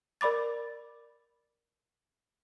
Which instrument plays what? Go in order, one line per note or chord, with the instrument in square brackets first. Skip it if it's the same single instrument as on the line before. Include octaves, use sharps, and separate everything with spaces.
[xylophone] A#4 D5 B5 D6 A6